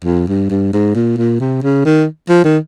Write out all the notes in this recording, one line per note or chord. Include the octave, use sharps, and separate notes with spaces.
F2
G2
G2
G#2
A#2
A#2
C3
C#3
D#3
F3
D#3